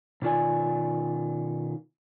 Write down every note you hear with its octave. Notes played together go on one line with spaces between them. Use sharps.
B2 D#3 F4 D5 G#5